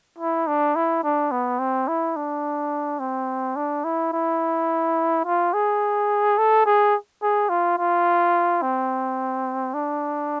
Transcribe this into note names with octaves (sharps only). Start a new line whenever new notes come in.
E4
D4
E4
D4
B3
C4
E4
D4
C4
D4
E4
E4
F4
G#4
A4
G#4
G#4
F4
F4
C4
D4